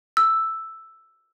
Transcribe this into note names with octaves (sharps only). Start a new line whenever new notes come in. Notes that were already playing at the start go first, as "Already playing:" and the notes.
E6